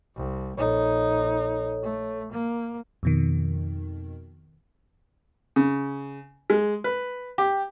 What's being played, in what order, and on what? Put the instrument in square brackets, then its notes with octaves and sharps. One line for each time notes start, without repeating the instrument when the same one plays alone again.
[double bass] C2
[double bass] A#1 D#4 [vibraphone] A4 C#5
[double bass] A3
A#3
[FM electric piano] F2 B2 D#3
[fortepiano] C#3
G#3
B4
G4